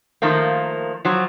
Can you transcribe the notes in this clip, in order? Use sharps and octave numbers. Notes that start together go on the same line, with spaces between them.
D#3 F3 A3 A#3
F3 F#3